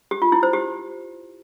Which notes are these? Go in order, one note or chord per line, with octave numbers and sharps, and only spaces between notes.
G4
F4
E4
C5
G4